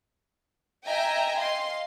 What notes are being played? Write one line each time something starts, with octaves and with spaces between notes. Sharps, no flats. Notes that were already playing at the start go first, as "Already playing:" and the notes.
D#5 E5 G5 G#5 A#5
D#5 F5 C6